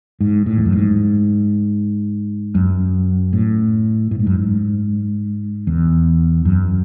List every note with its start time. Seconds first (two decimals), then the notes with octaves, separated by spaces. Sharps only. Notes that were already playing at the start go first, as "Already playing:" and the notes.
0.21 G#2
0.46 A2
0.58 E2
0.66 F#2
0.73 G#2
2.55 F#2
3.33 A2
4.11 A2
4.19 G#2
4.27 F#2
4.35 G#2
5.67 E2
6.45 F#2